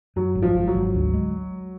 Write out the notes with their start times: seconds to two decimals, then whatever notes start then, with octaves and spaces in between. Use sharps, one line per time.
0.16 F#2 F#3
0.35 G#1
0.42 F3
0.55 G#1
0.68 F#3
0.75 G#1
0.94 D2
1.14 G#3